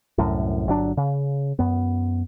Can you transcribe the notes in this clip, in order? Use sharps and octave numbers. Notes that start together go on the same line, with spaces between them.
C2 F#2 A2
G1 F#3 D4
C#3
F#2 B3